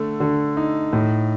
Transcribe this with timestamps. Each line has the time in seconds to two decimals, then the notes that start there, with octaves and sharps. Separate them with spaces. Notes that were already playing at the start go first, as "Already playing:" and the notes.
Already playing: D3 A3
0.20 D3
0.57 D#4
0.93 A2